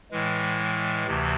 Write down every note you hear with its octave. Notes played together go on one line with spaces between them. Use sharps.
A2 E3 G#3
D2 C3 E3